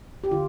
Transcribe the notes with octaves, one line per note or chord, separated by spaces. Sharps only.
G4
D3 F4